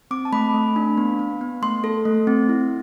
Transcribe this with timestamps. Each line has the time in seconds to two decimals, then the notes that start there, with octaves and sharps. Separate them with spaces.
0.11 C4 D6
0.25 A5
0.32 A3 B5
0.54 A3
0.76 D4
0.97 B3
1.19 B3
1.41 B3
1.62 A3 C6
1.84 A4
2.05 A3
2.27 C4
2.49 E4